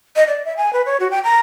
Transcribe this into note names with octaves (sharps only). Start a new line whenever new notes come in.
D#5
D5
E5
G#5
B4
C#5
F#4
G5
A#5